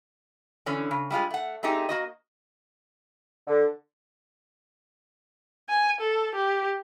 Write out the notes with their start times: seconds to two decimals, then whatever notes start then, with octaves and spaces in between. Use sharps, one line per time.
0.66 D3 E3 C#4
0.91 C#3
1.10 G3 G#3 F4 G#4
1.31 A3 F#5
1.63 A3 C4 D#4 G4 G#4
1.89 A#3 F#4 D#5
3.47 D3
5.69 G#5
6.01 A4
6.35 G4